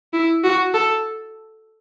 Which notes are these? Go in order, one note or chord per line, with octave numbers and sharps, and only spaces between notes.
E4
F#4
A4